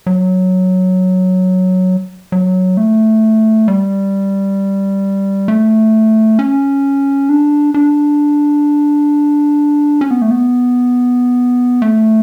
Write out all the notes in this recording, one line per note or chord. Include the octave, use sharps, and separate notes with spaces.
F#3
F#3
A3
G3
A3
C#4
D4
D4
C#4
B3
A3
B3
A3